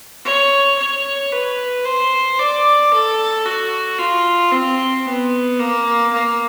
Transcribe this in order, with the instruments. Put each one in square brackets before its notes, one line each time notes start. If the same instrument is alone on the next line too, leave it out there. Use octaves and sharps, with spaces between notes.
[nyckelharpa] C#5
C#5
B4
C5
D5
A4
F#4
F4
C4
B3
A#3
A#3